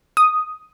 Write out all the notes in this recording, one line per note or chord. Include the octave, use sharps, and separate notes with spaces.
D#6